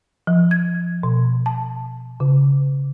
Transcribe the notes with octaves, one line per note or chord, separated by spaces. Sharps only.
F3
G#6
B2
A5
C#3